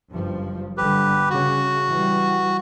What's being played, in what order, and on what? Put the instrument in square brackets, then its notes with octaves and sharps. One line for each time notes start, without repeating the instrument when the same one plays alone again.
[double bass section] F#1 G2 F3
[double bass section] G1 D3 G3 [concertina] G4 B4
[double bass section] C#3 [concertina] F#4
[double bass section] E3 G3